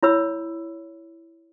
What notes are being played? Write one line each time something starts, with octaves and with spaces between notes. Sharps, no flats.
E4 C#5 B5 E6